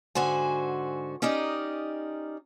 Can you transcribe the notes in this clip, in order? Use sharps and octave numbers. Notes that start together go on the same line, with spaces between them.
G#2 D3 F#4 C5 G#5
C#4 D#4 G4 A#4 D5 D#5